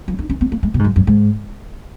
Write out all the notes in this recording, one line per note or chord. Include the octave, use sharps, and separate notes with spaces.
F3
D#4
C#4
B3
A#3
G#3
B2
G#2
F#2
F#2
G#2